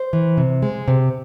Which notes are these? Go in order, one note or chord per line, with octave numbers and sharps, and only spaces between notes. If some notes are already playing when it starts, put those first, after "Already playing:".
Already playing: C5
E3
C3
G#3
C3